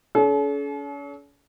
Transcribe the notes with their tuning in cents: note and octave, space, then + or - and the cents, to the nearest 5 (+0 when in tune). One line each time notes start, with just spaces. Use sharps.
C#4 +40 A4 -45